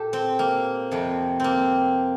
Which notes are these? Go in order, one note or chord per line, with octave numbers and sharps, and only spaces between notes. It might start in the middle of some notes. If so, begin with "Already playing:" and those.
Already playing: A#2 G4 A4
C4
A#3
F2 C3 F3
A#3 C4